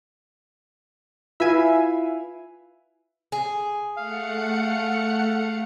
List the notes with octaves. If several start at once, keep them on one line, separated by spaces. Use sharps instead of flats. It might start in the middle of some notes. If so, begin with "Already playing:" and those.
E4 F4 B4 E5 F5 G#5
G#4
A3 F5 F#5 C#7